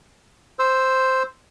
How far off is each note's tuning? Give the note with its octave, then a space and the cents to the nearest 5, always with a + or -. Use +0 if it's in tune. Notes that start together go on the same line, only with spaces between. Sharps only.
C5 +0 E6 +0